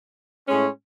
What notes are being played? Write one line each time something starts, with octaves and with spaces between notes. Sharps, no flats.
A2 G#3 C#4